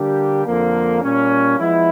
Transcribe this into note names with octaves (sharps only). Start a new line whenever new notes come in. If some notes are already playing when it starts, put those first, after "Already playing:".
Already playing: D3 G3 A#3 D4 G4
F2 D3 F3 A#3
A#2 G3 A#3 C#4
F3 G#3 B3 E4